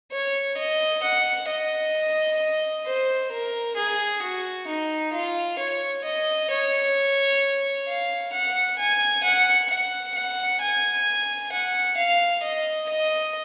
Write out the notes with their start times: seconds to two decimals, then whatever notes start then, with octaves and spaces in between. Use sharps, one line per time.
0.12 C#5
0.57 D#5
1.03 F#5
1.48 D#5
2.85 C5
3.31 A#4
3.76 G#4
4.22 F#4
4.67 D#4
5.13 F4
5.59 C#5
6.04 D#5
6.50 C#5
7.87 F5
8.33 F#5
8.78 G#5
9.23 F#5
9.70 F#5
10.14 F#5
10.61 G#5
11.52 F#5
11.97 F5
12.42 D#5
12.89 D#5